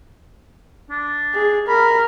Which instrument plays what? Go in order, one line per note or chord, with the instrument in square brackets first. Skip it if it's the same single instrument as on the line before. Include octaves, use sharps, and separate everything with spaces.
[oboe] D4
[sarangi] G#4
[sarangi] A#4 [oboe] B5